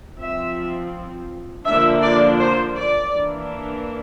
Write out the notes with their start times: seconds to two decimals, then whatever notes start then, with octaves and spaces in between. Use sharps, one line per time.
0.19 F3 C4 E5
1.65 D3 F3 A#3 D4 E5
2.02 D5
2.39 C5
2.76 D5
3.13 E3 A#3 D4